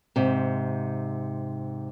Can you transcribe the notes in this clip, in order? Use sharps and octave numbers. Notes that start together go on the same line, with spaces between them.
G#2 C3